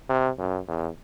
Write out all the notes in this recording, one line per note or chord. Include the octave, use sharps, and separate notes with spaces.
C3
F#2
E2